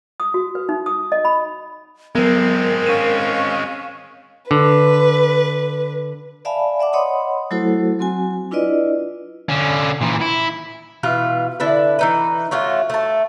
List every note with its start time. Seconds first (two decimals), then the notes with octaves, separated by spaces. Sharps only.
0.20 D#6
0.34 F#4
0.55 B4
0.69 D#4
0.86 D#6
1.12 D#5
1.25 B5
2.15 F#3 G#3 B3 C4 A#4
2.87 C#4 F5 D#7 E7
4.51 D3 B4
6.45 D5 E5 F5 G#5 A5 B5
6.79 D5 E5 F#5 D6
6.93 C#5 D#5 F#5 B5 C6 D#6
7.51 F#3 A3 E4 F#4 A4 C5
7.99 F#3 C4 F#4 G#5
8.51 D4 E4 F4 B4 D5 D#5
9.49 D3 C#4
10.02 A#2 E3
10.21 E4
11.03 B2 E3 F4 B4
11.60 D3 D4 E4 B4
11.99 E3 D#4 B4
12.51 A3 C#4 F4 F#4
12.90 A3 A5